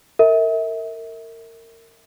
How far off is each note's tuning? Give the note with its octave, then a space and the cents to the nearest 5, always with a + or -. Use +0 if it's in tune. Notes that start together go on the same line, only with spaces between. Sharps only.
A#4 -30 E5 -35